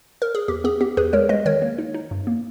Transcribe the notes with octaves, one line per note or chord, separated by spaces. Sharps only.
A#4
G#4
E2 G4
B3 G#4
B3 G4
E2 G#4 B4
G#3 A#4 C#5
G#3 B4 D#5
D#3 A#4 C#5
A#3
D#4
D#4
G2
A#3